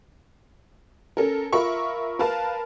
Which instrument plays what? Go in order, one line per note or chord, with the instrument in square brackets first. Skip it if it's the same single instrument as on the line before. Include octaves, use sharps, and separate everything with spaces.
[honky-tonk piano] C#4 A4 A#4
F4 A#4 E5 B5 C#6
A#4 B4 F5 A5